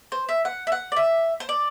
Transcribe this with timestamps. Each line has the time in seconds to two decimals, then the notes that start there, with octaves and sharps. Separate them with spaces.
0.12 C5
0.29 E5
0.45 F#5
0.67 E5
0.72 F#5
0.92 D5
0.96 E5
1.40 C5
1.49 D5